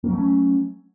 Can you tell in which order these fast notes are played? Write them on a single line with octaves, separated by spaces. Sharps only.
A#3 F#3 A3 C#4